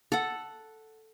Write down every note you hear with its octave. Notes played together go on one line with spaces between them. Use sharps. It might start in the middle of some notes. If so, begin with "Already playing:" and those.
A4 F#5